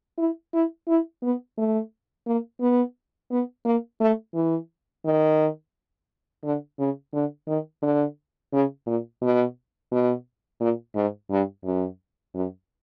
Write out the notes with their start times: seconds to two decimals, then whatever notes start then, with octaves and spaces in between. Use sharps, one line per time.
0.18 E4
0.53 E4
0.88 E4
1.23 B3
1.58 A3
2.27 A#3
2.61 B3
3.31 B3
3.65 A#3
4.00 A3
4.35 E3
5.05 D#3
6.44 D3
6.79 C#3
7.14 D3
7.47 D#3
7.82 D3
8.53 C#3
8.87 A#2
9.22 B2
9.92 B2
10.60 A#2
10.95 G#2
11.31 G2
11.65 F#2
12.34 F#2